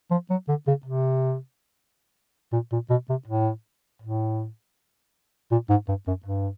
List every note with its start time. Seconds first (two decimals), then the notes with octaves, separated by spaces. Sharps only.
0.11 F3
0.30 F#3
0.48 D3
0.67 C#3
0.86 C3
2.53 A#2
2.72 A#2
2.90 B2
3.09 C3
3.28 A2
4.02 A2
5.51 A#2
5.70 G#2
5.88 G2
6.07 F#2
6.26 G2